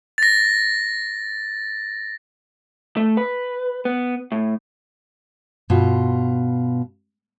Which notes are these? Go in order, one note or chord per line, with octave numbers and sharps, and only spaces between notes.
A6 A#6
A3
B4
B3
A2
G2 B2 F4